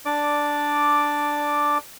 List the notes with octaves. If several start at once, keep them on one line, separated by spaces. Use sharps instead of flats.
D4 D5 D6